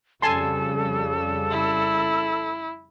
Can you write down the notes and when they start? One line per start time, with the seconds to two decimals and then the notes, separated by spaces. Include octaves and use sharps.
0.22 F2 C#3 G3 A4 G#5 A5 C6
1.50 E4